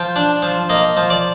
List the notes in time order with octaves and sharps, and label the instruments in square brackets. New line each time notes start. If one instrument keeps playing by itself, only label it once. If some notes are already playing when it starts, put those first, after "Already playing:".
Already playing: [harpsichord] F3 G5
D4
F3
A#3 D#5
F3
D5